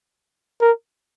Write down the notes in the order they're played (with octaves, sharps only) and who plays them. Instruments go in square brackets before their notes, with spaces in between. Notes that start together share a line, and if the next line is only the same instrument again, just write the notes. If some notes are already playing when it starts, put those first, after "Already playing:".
[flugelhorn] A#4